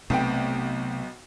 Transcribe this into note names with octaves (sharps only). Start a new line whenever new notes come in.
B1 C3 A3 B3 C4 G5